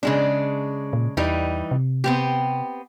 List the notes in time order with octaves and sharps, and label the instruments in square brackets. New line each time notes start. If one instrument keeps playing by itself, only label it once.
[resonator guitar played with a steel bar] C#3 G#3 D4
[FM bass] A#2
[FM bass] E2 [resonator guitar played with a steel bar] E3 G3 D#4
[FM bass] C3
[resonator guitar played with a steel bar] B3 C4 G4